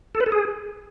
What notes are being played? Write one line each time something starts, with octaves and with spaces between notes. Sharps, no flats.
A4
B4
A4
G#4